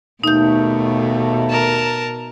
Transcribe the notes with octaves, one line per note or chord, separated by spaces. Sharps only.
D#2 B2 A3 D#4 G6
A#4 A5